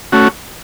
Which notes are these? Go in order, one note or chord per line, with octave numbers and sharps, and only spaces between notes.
A3 C#4 F#4